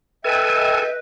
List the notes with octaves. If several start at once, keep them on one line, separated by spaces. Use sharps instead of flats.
A4 B4 D#5 E5 G5 G#5